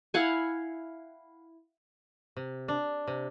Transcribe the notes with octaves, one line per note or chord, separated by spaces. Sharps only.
E4 F5 F#5 G#5
C3
D4
C3